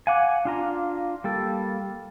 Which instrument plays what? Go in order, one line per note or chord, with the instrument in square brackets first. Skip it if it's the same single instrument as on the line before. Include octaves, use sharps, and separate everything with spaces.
[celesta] F5 D6 [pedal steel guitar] F#5 G#5
[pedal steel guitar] D4 F4 A#5
G3 A#3 A4